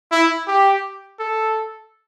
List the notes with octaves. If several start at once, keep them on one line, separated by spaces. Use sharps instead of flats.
E4
G4
A4